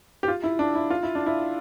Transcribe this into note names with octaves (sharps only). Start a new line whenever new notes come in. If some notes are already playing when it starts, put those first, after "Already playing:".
G4
F4
E4
D4
E4
F4
E4
D4
E4